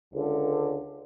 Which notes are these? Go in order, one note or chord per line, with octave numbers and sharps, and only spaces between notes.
C#2 D3